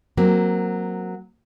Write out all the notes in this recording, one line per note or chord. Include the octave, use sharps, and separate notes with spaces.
F#3 A#3 C4